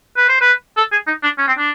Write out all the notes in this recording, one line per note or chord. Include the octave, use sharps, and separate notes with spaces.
B4
C5
B4
A4
G#4
D#4
D4
C#4
C4
D4